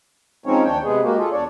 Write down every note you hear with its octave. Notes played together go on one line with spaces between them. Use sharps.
F3 G#3 C4 C#4 D#4 C#5
D#2 D4 C#5 G5
C3 G#3 B3 G#4
G#3 A#3 F#4 G4
F4 G#4 A4
E2 D4 C#5 D5